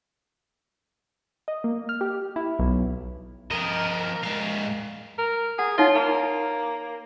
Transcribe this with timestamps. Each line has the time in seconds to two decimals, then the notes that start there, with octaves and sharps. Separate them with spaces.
1.48 D#5
1.64 A#3
1.89 F6
2.01 G4
2.36 E4
2.59 B1
3.51 F3 A#4 D#5
4.23 G#2 F5
5.19 A#4
5.59 G#4 F#5
5.78 D#4 F4 C#5 E5
5.95 A#3